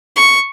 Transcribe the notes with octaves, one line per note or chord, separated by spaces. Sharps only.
C#6